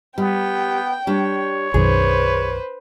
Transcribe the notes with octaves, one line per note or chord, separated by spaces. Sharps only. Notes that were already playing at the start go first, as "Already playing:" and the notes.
G3 B3 G5
G3 D4 C#5
B1 F#2 D#3 G#4 B4 C5